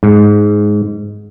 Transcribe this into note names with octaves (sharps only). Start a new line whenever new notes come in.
G#2